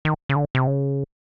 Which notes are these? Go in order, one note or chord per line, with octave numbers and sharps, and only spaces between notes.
D#3
C#3
D3
C3
C#3